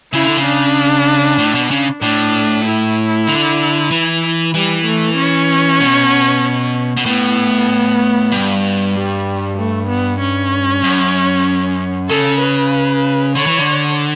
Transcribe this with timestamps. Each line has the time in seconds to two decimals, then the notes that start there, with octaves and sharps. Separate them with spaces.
0.13 C#3 E4
0.25 D3
0.37 C#3
0.45 D4
1.38 A2
1.55 B2
1.71 C#3
2.01 A2 D4
2.65 E4
3.27 D3
3.91 E3
4.54 E3 G3
4.85 A3
5.17 C#4
5.80 B2
6.97 B2
7.06 A2 B3
8.32 G2
8.94 G3
9.58 A3
9.89 B3
10.20 C#4
10.84 F#2
12.09 C#3 A4
12.40 B4
13.35 D3 C#5
13.46 E3
13.58 D3